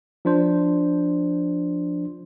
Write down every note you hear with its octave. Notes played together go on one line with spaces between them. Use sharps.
F3 D4 C5